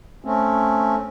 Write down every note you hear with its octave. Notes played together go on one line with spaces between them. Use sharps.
A3 C4 C#4